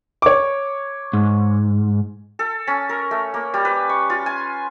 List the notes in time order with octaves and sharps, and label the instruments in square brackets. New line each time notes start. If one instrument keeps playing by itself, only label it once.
[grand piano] C#5 D6
[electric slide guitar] G#2
[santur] A4
C#4
A#4
A3
A#3
G3
B4
C#6
F4
G#5